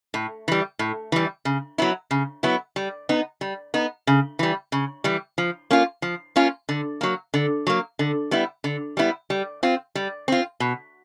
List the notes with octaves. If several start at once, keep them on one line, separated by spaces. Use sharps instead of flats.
A2
E3 G3
A2
E3 G3
C#3
F#3 B3 E4
C#3
F#3 B3 E4
G3
B3 D#4
G3
B3 D#4
C#3
E3 G3
C#3
E3 G3
F3
A#3 C#4 F4
F3
A#3 C#4 F4
D3
F#3 A#3
D3
F#3 A#3
D3
G3 B3 E4
D3
G3 B3 E4
G3
C4 F4
G3
C4 F4
B2